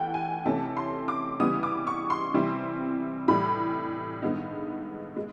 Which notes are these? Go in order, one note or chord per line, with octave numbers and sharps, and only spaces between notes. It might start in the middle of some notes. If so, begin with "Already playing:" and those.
Already playing: E2 E3 A3 F#5 G5
G#5
C3 E3 A3 C#4 A5
C6
D6
C#3 E3 G3 B3 D#6
D6
C#6
C6
C3 E3 G3 C4 E4
A2 E3 G3 B5
G2 D#3 G#3 B3 D#4
G#3